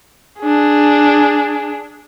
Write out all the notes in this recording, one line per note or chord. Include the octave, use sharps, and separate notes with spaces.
D4 G#4